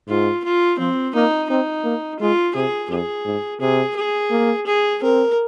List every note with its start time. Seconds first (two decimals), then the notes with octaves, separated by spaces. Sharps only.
0.08 G#2 F4
0.44 F4
0.79 F3 C4
1.14 A#3 D#4
1.50 C4 D#4
1.84 A#3
2.19 G#3 F4
2.55 C3 G#4
2.90 F2 G#4
3.26 G#2
3.60 C3 G#4
3.96 G#4
4.31 A#3
4.66 G#4
5.02 C4 A#4